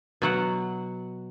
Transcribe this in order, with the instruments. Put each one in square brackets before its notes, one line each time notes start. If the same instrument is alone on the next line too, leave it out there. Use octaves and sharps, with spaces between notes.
[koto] B2 F#3 F#5